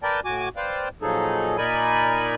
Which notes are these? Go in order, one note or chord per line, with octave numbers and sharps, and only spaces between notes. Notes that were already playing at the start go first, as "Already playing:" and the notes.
A#4 B4 D5 G5 A5
A2 F#4 G#5 D6
B4 C5 D5 F5 G5
A#2 F3 F#3 D#4 G#4 A4
A#2 D#4 A#4 D5 G#5 B5